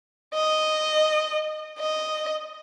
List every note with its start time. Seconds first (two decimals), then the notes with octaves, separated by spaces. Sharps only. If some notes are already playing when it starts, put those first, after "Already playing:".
0.34 D#5
1.78 D#5